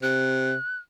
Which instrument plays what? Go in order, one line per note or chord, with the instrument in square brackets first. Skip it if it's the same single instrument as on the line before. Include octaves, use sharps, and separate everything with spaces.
[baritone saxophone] C3 [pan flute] F#6